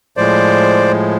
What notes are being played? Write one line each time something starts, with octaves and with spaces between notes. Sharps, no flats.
A2 F3 G#3 C5 D5